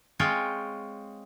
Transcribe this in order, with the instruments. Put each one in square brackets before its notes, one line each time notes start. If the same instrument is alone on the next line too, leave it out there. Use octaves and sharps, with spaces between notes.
[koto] G#3 C4 F4 C#5 G5